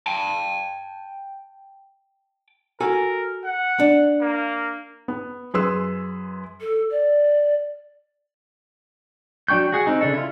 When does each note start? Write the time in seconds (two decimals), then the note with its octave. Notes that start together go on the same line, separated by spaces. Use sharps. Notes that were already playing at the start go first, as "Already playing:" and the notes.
0.07 G5 A5
2.81 F#4 A4 A#4 G#5
3.45 F#5
3.80 D4
4.22 A#3
5.08 B3
5.54 F#2 G#4 B4 C6 E6
6.60 A4
6.91 D5
9.48 F#3 D4 G5 C#6 G6
9.72 F#4 G#4 F#5
9.87 C4 D#4
10.01 C#3 D4 A4
10.13 E4 F4